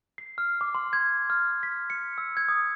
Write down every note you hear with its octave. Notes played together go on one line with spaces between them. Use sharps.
C7
F6
D6
C6
G#6
F6
B6
C#7
E6
G#6
D#6